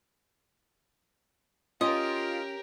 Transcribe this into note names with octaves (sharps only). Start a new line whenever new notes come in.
C#4 F4 G4 A#4 D#5